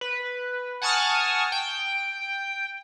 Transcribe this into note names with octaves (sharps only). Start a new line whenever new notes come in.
B4
F#5 G#5 A5 C#6 D#6 F6
G5